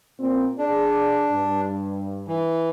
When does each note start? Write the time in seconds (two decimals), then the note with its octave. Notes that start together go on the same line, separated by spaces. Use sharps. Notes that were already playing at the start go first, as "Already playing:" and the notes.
0.19 A#2 C4
0.59 D4 G#4 D5
1.32 G2
2.28 E3